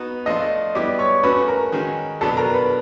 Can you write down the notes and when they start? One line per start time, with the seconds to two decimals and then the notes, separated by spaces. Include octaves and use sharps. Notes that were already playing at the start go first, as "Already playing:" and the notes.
Already playing: B3 D#4 F#4
0.26 F3 A3 D4 F4 D#5 D#6
0.75 G3 B3 E4 D5 D6
0.99 C#5 C#6
1.23 A3 C#4 F#4 B4 B5
1.48 A#4 A#5
1.72 D#3 G#3 C#4 F#4
2.21 B2 F#3 B3 D4 A4 A5
2.37 A#4 A#5
2.53 B4 B5